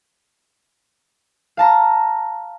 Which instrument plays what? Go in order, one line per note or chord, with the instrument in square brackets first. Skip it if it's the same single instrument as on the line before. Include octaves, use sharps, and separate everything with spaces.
[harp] F5 A5 A#5